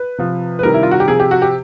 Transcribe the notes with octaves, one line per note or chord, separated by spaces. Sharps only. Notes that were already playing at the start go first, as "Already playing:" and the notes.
Already playing: B4
C3 F3
B4
C3 D#3 G3 A#4
E4
F4
F#4
G4
C3 F3 G#4
G4
F#4
G4